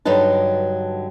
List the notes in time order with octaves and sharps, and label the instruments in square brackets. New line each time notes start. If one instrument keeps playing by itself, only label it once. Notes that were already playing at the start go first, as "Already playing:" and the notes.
[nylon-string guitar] G2 D3 F#3 D#4 B4 A5